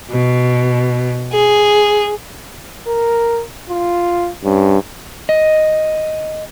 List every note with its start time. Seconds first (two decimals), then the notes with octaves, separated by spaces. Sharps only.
0.12 B2
1.32 G#4
2.87 A#4
3.70 F4
4.44 G2 C#4
5.29 D#5